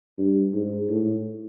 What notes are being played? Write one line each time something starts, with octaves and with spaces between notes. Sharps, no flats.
G2
G#2
A2